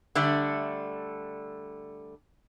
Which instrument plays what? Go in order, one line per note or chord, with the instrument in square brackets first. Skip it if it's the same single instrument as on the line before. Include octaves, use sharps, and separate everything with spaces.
[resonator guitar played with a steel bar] D3 G3 A3 D4